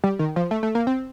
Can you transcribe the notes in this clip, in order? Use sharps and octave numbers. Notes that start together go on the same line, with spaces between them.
G3
D#3
F3
A3
A3
A#3
C4